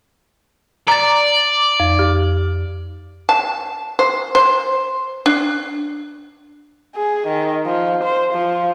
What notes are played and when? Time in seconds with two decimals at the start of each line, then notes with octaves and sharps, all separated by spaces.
0.88 D5 A#5 A6
1.80 F2
1.99 G4
3.29 A5
3.99 C5
4.35 C5
5.26 D4
6.96 G#4
7.28 D#3
7.66 F3
8.04 C5
8.34 F3